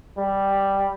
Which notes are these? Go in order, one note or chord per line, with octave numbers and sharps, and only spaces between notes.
G3